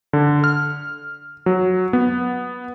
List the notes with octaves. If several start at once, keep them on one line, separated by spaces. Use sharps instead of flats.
D3
F6
F#3
B3